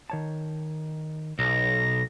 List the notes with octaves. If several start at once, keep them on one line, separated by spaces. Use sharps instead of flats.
D#3 C#5 A5
B1 A#6